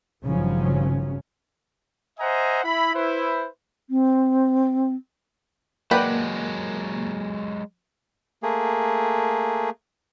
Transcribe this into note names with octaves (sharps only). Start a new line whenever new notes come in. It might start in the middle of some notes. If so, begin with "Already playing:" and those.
G#1 G2 C#3 F3 F#3 C#4
C5 D#5 E5 F#5 G#5 A#5
E4 B5
E4 B4 C5
C4
F#3 G#3 A#3 B4 D5 F#5 G5 B5
A3 A#3 G#4